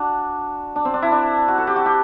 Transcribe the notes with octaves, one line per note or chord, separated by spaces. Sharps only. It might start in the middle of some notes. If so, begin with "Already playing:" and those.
Already playing: D4 F#4
D4
C4
D4
E4
D4
F#4
A4
G4
F#4
G4